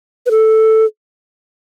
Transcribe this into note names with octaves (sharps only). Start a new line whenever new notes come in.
B4
A4